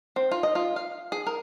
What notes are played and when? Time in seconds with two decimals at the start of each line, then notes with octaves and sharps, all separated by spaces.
0.16 C4
0.31 F4
0.43 D#5
0.55 F4
0.76 F5
1.12 G#4
1.27 A#4